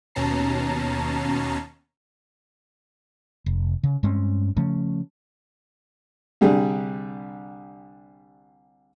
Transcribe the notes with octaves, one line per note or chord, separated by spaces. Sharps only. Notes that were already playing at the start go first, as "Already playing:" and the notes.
D#2 B2 C#4 A5 A#5 C7
F1
C#3
G2 G#3 C4 C#4
C#3 F3 A3 C#4
C2 D3 G3 G#4